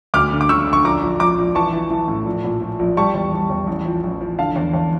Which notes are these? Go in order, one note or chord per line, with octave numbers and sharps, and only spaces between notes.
D2 D6 F6
D3
D6
D3 C#6 E6
D3
C#6
A#1 A#5 D6
A#1
F3 A#5 D6
A#1
E3 A5 C#6
E3
E3
A2
A#1
A#2
F3
A#1
G3 A5 C#6
E2
G3
E2
A1
F3
A1
F3
D3 F5 A5
E2
E2